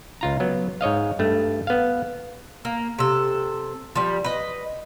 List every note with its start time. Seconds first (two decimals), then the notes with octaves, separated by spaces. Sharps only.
0.21 C#2 F4 A#5
0.40 F#3 B3
0.81 G#2 C#5 D#5 F5
1.19 G2 A3
1.67 B3 F5
2.65 A#3
2.99 C3 A4
3.95 F3 G3
4.24 B4 D#5